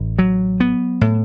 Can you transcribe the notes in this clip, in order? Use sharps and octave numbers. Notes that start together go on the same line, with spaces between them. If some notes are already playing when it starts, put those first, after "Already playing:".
Already playing: A1
F#3
B3
A2